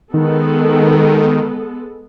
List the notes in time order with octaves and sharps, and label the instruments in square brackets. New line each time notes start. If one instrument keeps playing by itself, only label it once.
[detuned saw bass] D#3 [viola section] G#3 B3 A4